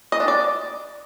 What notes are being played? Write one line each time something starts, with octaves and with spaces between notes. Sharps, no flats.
D#5
D4
D5